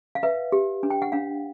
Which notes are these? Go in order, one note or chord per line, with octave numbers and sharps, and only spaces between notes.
F5
B4 E5
G4
D4
G5
F#5
D4 F5